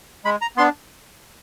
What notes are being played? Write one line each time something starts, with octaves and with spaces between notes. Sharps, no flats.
G#3 B5
A#5
B3 D4 C6